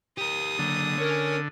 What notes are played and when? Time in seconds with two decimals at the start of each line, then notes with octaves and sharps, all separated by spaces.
0.18 G4 A#4 D#6
0.59 D3 F#3 A#3
0.99 C#4 A#4 C#5